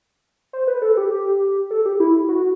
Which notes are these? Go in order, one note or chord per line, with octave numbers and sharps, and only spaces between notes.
C5
B4
A4
G4
A4
G4
E4
F#4